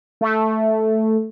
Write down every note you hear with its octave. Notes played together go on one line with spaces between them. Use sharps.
A3